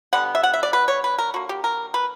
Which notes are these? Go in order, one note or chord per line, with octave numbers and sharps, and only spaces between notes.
D3 G3 B3 F#5
E5
F#5
E5
D5
B4
C#5
B4
A#4
D3 A#3 F#4
G4
A#4
B4